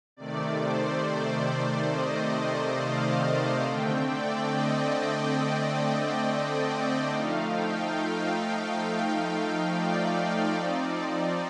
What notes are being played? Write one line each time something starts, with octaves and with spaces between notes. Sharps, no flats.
C3 D#3 A3 D5
C5
D5
C5
D5
D#5
F5
D3 A3 C4 G5
D5
D#5
D#5
D5
D5
F3 A3 D#4 F5
G5
F5
D5
F3 C4 D#4